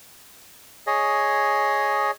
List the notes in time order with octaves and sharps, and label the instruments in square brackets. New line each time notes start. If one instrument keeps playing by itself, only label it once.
[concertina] G#4 C#5 D#5